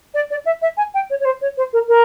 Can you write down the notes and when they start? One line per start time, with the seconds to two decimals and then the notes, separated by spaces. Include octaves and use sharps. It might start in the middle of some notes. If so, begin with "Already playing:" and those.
0.14 D5
0.30 D5
0.45 E5
0.61 E5
0.77 G#5
0.94 G5
1.10 C#5
1.20 C#5
1.25 C5
1.41 C#5
1.57 C5
1.73 A#4
1.88 A#4